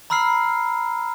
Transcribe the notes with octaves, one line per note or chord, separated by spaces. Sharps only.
A#5 B5 E6 F6 C7